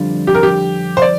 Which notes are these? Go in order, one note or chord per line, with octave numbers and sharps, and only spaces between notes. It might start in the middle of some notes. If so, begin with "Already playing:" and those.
Already playing: F2 D3 G3 D4 F4
G4
A#4
G4
C5
D5